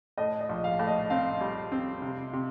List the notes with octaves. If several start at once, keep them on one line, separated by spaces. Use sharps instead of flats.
A2 D#5
D#5
A#1
F5
A2
D#5
C4 F5
G3
C4
C3
C3